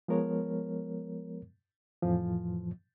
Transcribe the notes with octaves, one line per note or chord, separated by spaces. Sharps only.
F3 G#3 B3 A#4 C#5
F2 A2 E3 F3